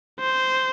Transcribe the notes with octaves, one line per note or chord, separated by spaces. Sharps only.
C5